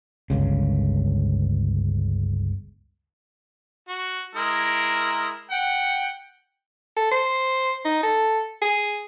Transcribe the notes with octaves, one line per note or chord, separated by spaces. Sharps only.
G1 C#2 C#3
F#4
G#3 E4 A#4
F#5 G5
A4
C5
D#4
A4
G#4